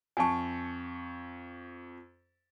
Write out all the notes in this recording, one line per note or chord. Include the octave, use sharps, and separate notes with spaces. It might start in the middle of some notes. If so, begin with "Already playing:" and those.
F2 G#5 A5 C#6